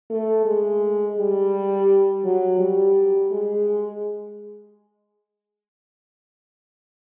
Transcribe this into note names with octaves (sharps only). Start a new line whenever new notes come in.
A3
G#3
G3
F#3
G3
G#3